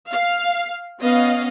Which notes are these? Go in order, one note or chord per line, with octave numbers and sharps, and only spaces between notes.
F5
B3 C#4 D#5 F5